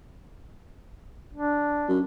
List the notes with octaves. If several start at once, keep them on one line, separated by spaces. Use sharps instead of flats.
D4
F#2